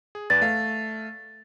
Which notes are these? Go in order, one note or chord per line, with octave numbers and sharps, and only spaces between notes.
G#4
E2 B4 D5 A6
A3 F5